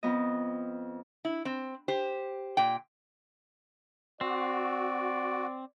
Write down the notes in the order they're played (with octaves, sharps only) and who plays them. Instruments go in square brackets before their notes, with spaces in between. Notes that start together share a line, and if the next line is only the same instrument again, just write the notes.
[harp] F2 B3 D#5
[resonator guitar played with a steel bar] E4
C4
G4 C5
A#2 G5
[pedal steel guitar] C4 [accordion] F#4 [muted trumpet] D5